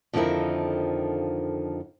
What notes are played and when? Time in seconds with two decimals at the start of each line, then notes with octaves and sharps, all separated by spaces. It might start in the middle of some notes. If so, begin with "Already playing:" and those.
0.13 F2 D3 D#3 F3 E4 A#4